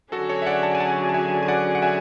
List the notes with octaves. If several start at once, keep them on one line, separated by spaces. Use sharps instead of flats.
D3 F#3 C#4 F#4 G#4 A4
A4 C#5
E5
D5 F#5
F#5 A5
G#5
F#5 A5
A5
E5 G#5
G#5
D5 F#5
F#5
E5 G#5